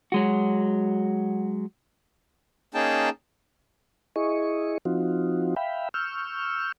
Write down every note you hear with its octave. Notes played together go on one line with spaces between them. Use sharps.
F#3 G#3 F#4
A#3 C#4 D#4 G#4 G5 A5
E4 G#4 D#5 C#6
F3 C4 D#4 F4 F#4
E5 F5 G5 B5
C#6 E6 F6 G6